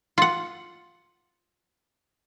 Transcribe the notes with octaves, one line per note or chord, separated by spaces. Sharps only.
F4 F#5